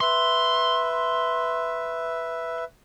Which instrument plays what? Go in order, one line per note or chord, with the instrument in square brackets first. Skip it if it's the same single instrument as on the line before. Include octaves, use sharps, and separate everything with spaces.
[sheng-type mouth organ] B4 E5 [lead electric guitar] C6